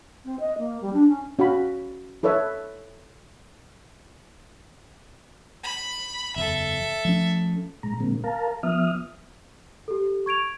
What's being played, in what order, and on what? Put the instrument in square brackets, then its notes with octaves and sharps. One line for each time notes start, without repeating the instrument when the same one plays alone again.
[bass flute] C4
D#5
A#3
G3
D4
C#4
[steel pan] C#4 F#4 F5 B5
E4 A4 B4 C#5 E5
[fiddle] B5
[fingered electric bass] F#1 E2 [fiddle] A4 E5
[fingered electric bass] F3 A3 C#4
[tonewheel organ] A#2 G#3 A#5
A#2 D3 G#3 A#3 C4
A#4 F5 A5 A#5
F3 B3 E5 D#6 F6
[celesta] G4 A4
C#6 G#6 D7 F7